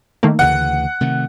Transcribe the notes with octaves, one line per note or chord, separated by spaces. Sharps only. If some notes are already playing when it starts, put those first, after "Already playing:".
D#3 A3 A#3
D2 C#3 E3 F#5
C3 D#3 A3